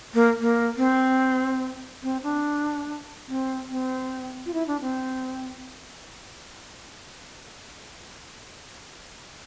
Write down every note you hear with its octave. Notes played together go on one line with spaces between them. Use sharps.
A#3
A#3
C4
C4
D4
C4
C4
F4
E4
D4
C4